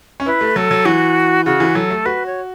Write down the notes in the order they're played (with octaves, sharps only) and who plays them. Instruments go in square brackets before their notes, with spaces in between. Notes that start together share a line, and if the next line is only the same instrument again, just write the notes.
[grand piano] C#4
[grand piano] E4 [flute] B4
[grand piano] A3
[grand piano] F#3 [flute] A4
[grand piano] F#3
[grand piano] E3 [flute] F#4
[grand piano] C#3 [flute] F#4
[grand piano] E3
[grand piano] F#3 [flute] A4
[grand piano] A3
[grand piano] F#4 [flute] B4
[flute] C#5